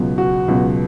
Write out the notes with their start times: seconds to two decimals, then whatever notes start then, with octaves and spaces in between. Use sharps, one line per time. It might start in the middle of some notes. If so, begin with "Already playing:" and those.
Already playing: C#2 B2 F#3
0.18 F#4
0.48 C#2 B2 F#3